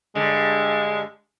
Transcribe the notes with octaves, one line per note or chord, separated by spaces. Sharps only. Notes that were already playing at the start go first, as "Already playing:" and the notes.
G2 D3 G#3